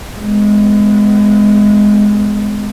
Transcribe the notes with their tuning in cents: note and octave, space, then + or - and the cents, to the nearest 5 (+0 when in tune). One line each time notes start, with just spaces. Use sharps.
G#3 +0 B3 +40